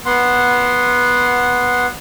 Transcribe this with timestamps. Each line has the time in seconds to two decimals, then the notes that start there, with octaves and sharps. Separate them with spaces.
0.06 B3 F#5 C6